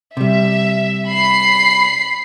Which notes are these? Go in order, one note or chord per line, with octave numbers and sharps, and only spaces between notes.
C3 G3 E5
B5 C7